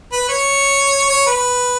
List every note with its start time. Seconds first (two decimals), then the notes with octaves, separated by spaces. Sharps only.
0.12 B4
0.29 C#5
1.10 C#5
1.27 B4